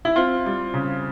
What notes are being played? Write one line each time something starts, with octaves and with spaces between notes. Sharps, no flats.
E4
C4 F4
G3
C#3